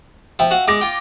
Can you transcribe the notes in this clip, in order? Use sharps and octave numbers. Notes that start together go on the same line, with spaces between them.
F3 E5 G5
F#4 F5
G#3 D6 A#6
F4 G5